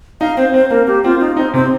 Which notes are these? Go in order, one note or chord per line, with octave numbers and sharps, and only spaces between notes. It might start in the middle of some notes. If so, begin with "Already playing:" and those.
D#4 F5
C4 C5
C4 C5
A#3 A#4
A#3 G4
C4 F4
D#4 F4
C4 D#4
C3 C4